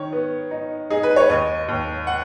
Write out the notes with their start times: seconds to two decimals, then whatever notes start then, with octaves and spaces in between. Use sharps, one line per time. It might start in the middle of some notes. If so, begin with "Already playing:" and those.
Already playing: D#3 C#5
0.12 B3
0.51 D#4
0.90 D#4 G#4
1.03 B4
1.16 C#5
1.29 D#2 D#5
1.68 D#2
2.07 F#5